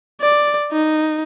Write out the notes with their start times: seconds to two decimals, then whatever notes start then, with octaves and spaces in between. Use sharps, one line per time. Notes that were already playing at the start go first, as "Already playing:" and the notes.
0.21 D5
0.72 D#4